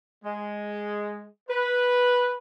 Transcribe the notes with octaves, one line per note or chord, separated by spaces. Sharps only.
G#3
B4